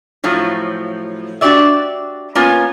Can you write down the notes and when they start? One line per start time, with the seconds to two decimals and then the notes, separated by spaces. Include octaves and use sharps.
0.24 A2 F3 F#3
1.41 D4 F#4 G4 D5 E5
2.35 A#3 B3 C#4 F4